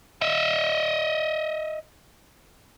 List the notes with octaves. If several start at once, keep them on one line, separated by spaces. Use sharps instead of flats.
D#5 E5